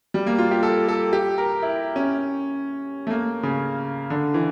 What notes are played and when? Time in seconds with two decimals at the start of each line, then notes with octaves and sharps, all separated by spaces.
0.14 G3
0.27 A#3
0.38 F4
0.51 G4
0.63 A4
0.88 A4
1.13 G4
1.38 A#4
1.62 E4
1.96 C#4
3.07 A3
3.10 A#3
3.43 C#3
4.10 D3
4.34 E3